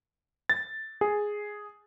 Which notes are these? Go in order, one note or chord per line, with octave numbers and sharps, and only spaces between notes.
A6
G#4